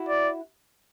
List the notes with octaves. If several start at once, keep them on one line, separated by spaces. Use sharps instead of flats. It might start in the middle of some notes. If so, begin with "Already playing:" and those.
Already playing: E4 F#4
D5